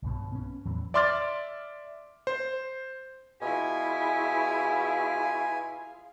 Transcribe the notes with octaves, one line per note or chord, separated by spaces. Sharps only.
B1 G2 B2
B3 C#4
E2 A2 E3 F#3
D5 E5 C6 D6 F6 A6
C5
B2 E4 F4 G#4 G#5